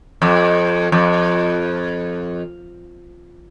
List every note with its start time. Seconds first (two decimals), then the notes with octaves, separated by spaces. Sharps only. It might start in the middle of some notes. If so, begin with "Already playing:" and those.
0.22 F2
0.92 F2